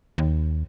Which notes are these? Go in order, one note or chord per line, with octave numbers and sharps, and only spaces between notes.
D#2